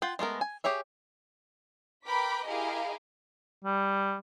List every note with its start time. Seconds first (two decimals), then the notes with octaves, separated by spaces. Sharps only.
0.02 F4 F#5 G5
0.19 G#3 A3 B3 A#4
0.41 G#5
0.64 G4 G#4 C#5 E5
2.06 A#4 B4 G5 B5 D6 B6
2.47 E4 G4 G#4 A#4 D#5 F5
3.64 G3